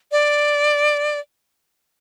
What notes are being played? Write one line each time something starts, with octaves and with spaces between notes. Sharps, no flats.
D5